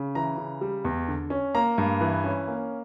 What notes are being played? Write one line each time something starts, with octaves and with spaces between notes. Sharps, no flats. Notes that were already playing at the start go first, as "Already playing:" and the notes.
Already playing: C#3
E3 A#5
C#3
G3
E2
D3
C#4
A#3 A#5
G2
E3
C#4
A#3